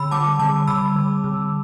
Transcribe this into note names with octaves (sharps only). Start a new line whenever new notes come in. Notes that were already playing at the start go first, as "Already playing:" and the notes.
Already playing: D3 B5 E6
G3 A5 D6
D3 A5 D6
D3 B5 E6
D3
D3